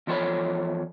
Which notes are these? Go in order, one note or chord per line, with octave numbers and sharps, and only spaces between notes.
E2 F3 A4 C5 C#5 B5